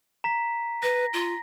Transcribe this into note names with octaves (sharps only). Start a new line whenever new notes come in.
A#5 B6
B4 A#6
F4